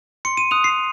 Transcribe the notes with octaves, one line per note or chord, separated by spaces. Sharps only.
C6 C#7
D#7
D#6 F#6 F7
C7